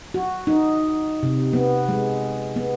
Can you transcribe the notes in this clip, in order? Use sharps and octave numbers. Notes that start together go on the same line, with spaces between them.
F#4
D#4
C3
B3
G#3
B3